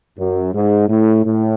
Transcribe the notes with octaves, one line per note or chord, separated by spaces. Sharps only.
F#2
G#2
A2
A2